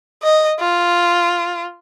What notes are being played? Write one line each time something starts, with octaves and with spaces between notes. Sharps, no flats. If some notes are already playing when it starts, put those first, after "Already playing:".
D#5
F4